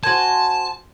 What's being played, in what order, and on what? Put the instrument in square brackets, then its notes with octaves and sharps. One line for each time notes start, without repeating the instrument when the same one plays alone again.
[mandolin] F#4 C5 G#5 [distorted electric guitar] A5